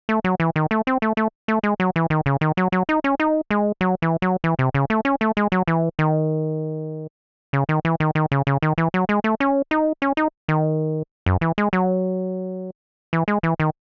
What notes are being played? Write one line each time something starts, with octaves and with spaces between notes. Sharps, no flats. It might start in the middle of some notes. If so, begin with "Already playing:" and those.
A3
F#3
E3
D#3
A3
C4
A3
A3
A3
G#3
F#3
E3
D#3
C#3
D#3
F#3
F#3
D#4
C#4
D#4
G#3
F#3
E3
F#3
E3
C3
C#3
A3
C#4
A3
G#3
F#3
E3
D#3
C#3
D#3
E3
D#3
D#3
C#3
C#3
D#3
E3
F#3
G#3
A3
C#4
D#4
C#4
D#4
D#3
F#2
E3
G#3
F#3
E3
G#3
E3
D#3